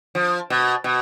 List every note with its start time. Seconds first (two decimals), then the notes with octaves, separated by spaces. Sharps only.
0.15 F3
0.50 B2
0.84 B2